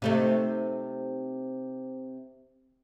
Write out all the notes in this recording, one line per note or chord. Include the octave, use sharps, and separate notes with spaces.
C3 A3 D#4